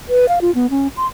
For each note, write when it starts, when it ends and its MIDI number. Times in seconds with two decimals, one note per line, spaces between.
0.09 0.28 71
0.29 0.39 77
0.41 0.53 65
0.55 0.70 59
0.70 0.88 61
0.97 1.07 84